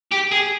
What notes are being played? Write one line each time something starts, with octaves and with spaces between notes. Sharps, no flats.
G4
G#4